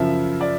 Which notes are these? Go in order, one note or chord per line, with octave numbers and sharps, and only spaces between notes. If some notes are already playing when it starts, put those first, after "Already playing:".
Already playing: F#2 C#3 F3 E5
D5